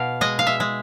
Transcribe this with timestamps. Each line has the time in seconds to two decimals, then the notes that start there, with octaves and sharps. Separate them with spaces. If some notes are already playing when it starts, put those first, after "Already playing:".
Already playing: B2 F5
0.21 G#3 D#5
0.39 F5
0.47 E5
0.60 G#3